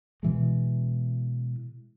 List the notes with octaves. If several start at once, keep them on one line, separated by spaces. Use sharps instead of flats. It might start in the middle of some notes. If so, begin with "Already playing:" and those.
B2 E3 G#3